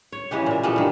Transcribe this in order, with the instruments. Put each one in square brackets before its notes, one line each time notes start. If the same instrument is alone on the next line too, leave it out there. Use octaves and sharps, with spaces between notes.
[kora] C#5
C#3 E3 G#3 G4
A#2 E5
E3 F3 G3 A3
G2 D#3